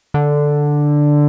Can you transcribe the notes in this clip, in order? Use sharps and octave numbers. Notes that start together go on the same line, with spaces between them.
D3